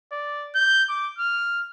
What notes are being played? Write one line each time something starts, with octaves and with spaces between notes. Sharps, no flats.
D5
G6
D6
F6